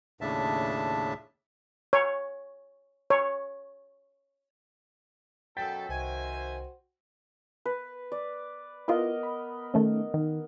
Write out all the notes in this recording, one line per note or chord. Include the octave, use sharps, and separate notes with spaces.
D#2 A2 C#3 D4 E5 A5
C#5
C#5
F#2 B2 F#3 A4 G5 G6 A6 B6
C2 D#3 F#4 C5 E5 G#5
B4
D5
B3 E4 F4 A#4 B4 D#5
B5
D#3 A3 C#4
D#3